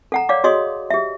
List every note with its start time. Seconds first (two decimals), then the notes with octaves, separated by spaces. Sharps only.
0.12 A4 F#5 A#5
0.29 C#5 D5 F5 D6
0.44 F#4 G#4 C#5 D#5 C6 D#6
0.90 G4 E5